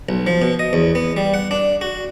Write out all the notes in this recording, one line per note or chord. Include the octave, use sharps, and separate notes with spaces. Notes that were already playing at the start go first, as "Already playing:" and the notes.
B1
F3
B2
D#5
E2
B3
G3
F#5
D4
F#4